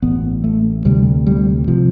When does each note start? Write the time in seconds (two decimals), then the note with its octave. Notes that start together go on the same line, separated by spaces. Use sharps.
0.02 A1 A2 B3
0.44 A3
0.85 D2 C3 G3
1.27 G3
1.68 C3 F3